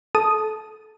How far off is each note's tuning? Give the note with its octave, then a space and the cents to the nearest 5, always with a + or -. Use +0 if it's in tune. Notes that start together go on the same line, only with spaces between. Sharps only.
A4 -25 A5 -10 D#6 +0